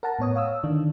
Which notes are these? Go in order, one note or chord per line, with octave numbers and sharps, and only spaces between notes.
A#4 F#5 A5 A#5
A2 B3 C#5 D#6
C#5 F5 D#6 E6
D3 D#3 D4